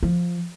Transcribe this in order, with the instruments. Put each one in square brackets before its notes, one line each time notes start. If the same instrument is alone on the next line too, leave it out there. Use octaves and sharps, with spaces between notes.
[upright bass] F3